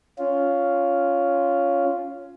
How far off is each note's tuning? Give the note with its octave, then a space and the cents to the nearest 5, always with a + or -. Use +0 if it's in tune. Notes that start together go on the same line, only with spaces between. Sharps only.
C#4 +10 F4 +0